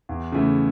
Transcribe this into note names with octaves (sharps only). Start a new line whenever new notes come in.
E2
C#3 E3 A3